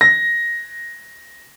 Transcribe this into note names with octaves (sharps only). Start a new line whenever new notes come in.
A#6